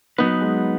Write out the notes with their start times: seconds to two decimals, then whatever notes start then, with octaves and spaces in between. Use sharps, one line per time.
0.18 F#3 B3 D#4 B4
0.41 G#3